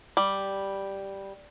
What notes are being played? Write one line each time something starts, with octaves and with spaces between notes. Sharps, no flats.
G3